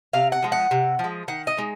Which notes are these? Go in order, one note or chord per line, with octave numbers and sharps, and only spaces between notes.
C3 F5
F#5
F3 G#3
F#5
C3
F3
G#3
D#3 F#5
D#5
G#3 D#4